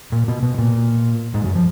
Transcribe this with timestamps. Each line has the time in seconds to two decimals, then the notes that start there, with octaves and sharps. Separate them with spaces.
0.12 A#2 A#3
0.28 B2 B3
0.42 B2 B3
0.58 A#2 A#3
1.34 G#2 G#3
1.44 F#2 F#3
1.55 F3